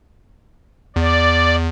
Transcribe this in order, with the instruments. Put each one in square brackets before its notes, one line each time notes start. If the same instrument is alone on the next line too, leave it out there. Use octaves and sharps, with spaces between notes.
[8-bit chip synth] E2 [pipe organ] D5